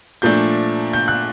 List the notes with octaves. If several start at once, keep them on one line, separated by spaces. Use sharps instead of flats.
A#2 F3 A3 D4 G6
G6
F#6